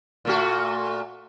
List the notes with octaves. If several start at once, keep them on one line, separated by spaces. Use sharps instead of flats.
A#2 A3 F#4